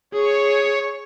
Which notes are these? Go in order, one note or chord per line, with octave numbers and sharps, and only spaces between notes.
G#4 C#5